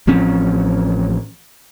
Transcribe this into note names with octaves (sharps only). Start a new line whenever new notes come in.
A1 F3 C4 C#4